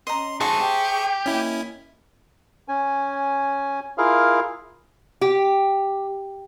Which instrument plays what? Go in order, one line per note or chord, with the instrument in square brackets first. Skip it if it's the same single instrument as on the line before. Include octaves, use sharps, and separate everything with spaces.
[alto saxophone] C#4 [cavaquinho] D#5 A#5 [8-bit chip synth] C6
[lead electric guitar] D#4 F#4 [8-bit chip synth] G#4 C#6 [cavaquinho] C5 E5 A5
[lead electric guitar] G4 [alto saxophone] G5
[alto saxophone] A#3 [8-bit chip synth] C#4 E4 [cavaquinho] D#5
[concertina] C#4 G#5
E4 F4 G#4 A#4 F5
[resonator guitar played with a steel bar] G4